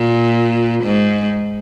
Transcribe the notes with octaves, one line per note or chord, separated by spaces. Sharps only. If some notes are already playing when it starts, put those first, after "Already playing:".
Already playing: A#2
G#2